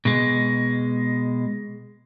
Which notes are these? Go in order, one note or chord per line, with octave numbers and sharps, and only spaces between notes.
B2 G#3